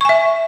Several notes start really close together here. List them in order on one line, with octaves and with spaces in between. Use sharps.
C#6 G#5 E5